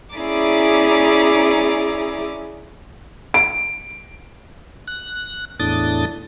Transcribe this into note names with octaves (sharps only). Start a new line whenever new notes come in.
C#4 E4 G#4 D5 A#5 D6
D7
F#6
E2 A2 D4 D#6 A6